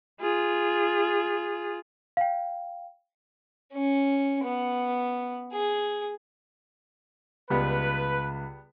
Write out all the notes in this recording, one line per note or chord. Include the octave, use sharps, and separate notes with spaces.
F4 G#4
F5 G5
C#4
B3
G#4
C#2 G3 B3 B4